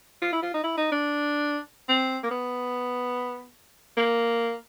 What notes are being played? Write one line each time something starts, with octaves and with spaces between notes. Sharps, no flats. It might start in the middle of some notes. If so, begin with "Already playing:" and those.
F4
E4
F4
D#4
E4
D#4
D4
C4
A#3
B3
A#3